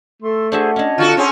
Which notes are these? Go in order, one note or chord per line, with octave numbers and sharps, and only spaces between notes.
A3 A4 C6
D4 F#4 G#4 C5 E5
C#4 D4 C#5 D#5
D3 F4 F#4 A4
C4 C#4 G#4 F#5 C6